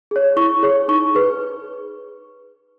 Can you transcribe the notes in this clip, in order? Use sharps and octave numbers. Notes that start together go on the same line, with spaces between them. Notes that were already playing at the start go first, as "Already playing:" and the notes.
G#4 C#5
E4 C#6
G#4 C#5
D#4 C#6
G#4 B4